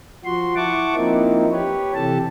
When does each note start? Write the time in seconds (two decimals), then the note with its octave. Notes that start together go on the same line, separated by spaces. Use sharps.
0.25 F3 F#4 C6
0.56 E4 F#5 A5 C#6 D6
0.96 F3 A#3 C4 D#4 E4
1.52 G4 B4 C#5
1.95 C3 E3 G4 A4 A5